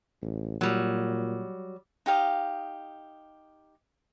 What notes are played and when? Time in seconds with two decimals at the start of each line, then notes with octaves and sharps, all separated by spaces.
0.22 A1
0.61 A#2 F#3 G3
2.06 D#4 G4 F5 D#6